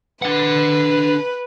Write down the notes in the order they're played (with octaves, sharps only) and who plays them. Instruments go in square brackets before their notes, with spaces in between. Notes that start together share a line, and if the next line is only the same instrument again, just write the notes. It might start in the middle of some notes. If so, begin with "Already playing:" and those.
[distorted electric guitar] D4 F#5 [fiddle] B4